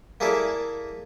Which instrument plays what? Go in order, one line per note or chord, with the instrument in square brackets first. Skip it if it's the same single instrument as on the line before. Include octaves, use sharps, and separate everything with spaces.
[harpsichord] A#3 E4 G#4 A4 D5 E5